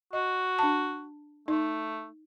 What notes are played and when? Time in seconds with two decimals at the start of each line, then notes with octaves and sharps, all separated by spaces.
0.13 F#4 D#5
0.59 D4 A5
1.48 A3 D#4